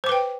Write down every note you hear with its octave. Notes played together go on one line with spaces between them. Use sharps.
B4 C5 G5 D6